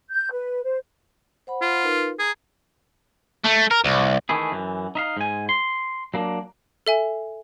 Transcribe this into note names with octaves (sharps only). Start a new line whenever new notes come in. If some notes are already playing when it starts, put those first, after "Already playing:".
G6
B4
C5
C5 F#5 B5
F4
D#4 A#4 B4
G#4 A#5
A3
A#4
C2
D#3 E3 A3 E4 G#4
F#2 E3
D#4 E5 F5
G#2 G#5
C6
F#3 A#3 D4
A4 E5 G#5